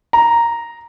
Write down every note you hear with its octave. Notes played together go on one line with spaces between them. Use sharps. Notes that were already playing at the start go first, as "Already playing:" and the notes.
A#5